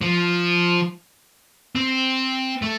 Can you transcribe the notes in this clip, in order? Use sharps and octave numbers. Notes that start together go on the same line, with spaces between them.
F3
C4
A3